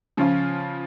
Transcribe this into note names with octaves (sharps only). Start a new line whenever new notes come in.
C#3 F3 C#4 F4